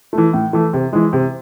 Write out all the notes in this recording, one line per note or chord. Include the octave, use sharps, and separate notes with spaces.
E3 A3
A2
E3 A3
C3
E3 G#3
C3